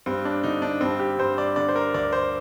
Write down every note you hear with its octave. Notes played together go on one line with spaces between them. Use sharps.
G2 C4
D4
D3 D#4
D4
G2 C4
G4
G2 C5
D5
D3 D5
C5
A#4
D2 D5
C5